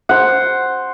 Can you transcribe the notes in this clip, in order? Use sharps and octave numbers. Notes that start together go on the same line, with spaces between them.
C5 F#5